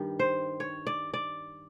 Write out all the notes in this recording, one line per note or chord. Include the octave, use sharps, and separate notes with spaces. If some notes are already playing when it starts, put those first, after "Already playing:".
Already playing: G2 D#3 G3
C5
C#5
D5
D5